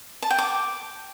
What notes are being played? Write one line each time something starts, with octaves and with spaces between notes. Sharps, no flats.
A5
G5
D6